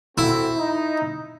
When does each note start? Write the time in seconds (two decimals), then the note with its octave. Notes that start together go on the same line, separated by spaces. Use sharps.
0.18 C4 E4 F#4 A4
0.58 D#4